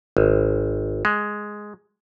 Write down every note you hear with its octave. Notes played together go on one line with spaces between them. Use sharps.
G#1
G#3